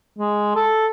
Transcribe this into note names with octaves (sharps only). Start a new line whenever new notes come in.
G#3
A4